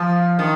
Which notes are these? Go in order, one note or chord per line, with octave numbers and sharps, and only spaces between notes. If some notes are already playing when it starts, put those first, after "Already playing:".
Already playing: F3
D#3